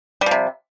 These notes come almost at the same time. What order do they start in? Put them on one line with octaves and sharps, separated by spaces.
G3 F3 C3